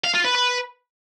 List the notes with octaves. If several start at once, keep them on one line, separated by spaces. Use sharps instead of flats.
F5
F4
B4
B4